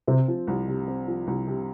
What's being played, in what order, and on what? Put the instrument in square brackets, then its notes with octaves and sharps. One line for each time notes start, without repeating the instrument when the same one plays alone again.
[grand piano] C3 [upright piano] C4
[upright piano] F3
C2
C3
C4
F3
C2
C3